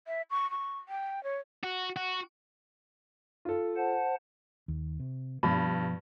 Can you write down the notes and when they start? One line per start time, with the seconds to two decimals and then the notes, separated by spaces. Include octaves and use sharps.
0.07 E5
0.31 C#6
0.51 C#6
0.89 G5
1.24 C#5
1.64 F#4
1.96 F#4
3.45 F4 A4
3.77 C5 F#5 A5
4.68 D#2
5.00 C3
5.43 G2 B2 F3 B3 B5